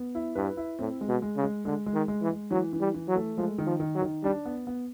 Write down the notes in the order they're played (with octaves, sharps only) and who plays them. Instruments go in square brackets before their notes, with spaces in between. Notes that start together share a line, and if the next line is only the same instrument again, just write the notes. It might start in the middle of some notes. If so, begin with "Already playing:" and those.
Already playing: [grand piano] B3
E4
[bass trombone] G2 [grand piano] B4
[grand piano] E4
[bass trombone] A2 [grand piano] C4
[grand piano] G#3
[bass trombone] B2
[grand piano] G#3
[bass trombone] C#3
[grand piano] G#3
[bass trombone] D3 [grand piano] G#3
[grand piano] G#3
[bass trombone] D#3
[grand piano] G#3
[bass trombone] E3
[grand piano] G#3
[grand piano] E3 [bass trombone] F#3
[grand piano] E3
[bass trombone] G3
[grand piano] E3
[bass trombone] F#3
[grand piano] A3
[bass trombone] F3 [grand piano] G#3
[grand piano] D#3
[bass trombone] F3
[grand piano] D#3
[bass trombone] F#3
[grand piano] D#3
[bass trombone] G3 [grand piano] D4
[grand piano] B3
B3